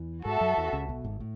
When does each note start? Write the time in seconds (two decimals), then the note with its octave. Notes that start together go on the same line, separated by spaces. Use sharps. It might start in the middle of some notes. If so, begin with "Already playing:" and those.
Already playing: E2 E3
0.25 G#2 G#3 F#4 A4 E5
0.41 F#2 F#3
0.57 E2 E3
0.73 C#2 C#3
0.89 B1 B2
1.04 G#1 G#2
1.20 A2